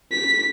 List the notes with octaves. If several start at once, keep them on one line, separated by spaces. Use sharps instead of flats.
B6